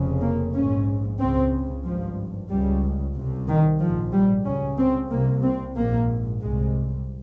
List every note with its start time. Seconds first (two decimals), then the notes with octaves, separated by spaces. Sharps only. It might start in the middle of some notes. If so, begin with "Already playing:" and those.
Already playing: F1 F2 C#3
0.21 A#3
0.53 A#1 G#2 C#4
1.19 C#2 C#3 C4
1.84 G#1 G2 F3
2.50 C#2 C#3 G3
3.15 C2 C3
3.48 D#3
3.80 A#1 G#2 F3
4.13 G3
4.45 C#2 C#3 C#4
4.78 C4
5.10 C2 C3 A#3
5.43 C4
5.76 A#1 G#2 A#3
6.41 C2 C3 G#3